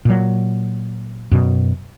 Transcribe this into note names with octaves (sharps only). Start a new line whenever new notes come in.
A#2 F#3
F#2 B2